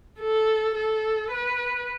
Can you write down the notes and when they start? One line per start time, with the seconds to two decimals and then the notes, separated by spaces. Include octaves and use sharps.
0.20 A4
0.75 A4
1.31 B4